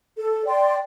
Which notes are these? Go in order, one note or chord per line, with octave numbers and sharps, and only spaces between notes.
A4
D5 G5 C6